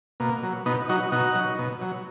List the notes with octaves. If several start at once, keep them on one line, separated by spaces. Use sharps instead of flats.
B2 A#3
F#3
B2 B3 D#4
F#3 D#4 F#4
B2 D#4 F#4
F#3
B2
F#3